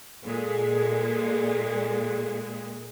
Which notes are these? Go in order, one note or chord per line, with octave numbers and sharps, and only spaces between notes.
A#2 G#3 G#4 A4